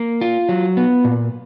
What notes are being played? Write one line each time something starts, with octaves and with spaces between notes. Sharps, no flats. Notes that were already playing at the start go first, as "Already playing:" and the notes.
Already playing: A#3
F4
F#3
B3
A#2